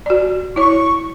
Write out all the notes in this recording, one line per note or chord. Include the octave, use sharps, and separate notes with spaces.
F#4 D5
E4 C#5 C#6